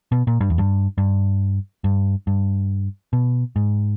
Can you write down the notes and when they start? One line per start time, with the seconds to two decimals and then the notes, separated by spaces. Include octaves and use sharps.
0.12 B2
0.27 A#2
0.41 G2
0.50 E2
0.58 G2
0.98 G2
1.84 G2
2.27 G2
3.13 B2
3.56 G#2